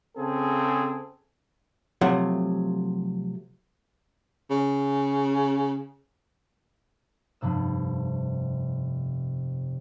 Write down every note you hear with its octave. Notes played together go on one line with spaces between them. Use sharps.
C#3 C4 G#4 A4
C3 F3 F#3 A3
C#3
F1 G2 C3 B3 E6